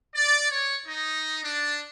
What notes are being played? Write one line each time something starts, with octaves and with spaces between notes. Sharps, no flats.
D5
C#5
D#4
D4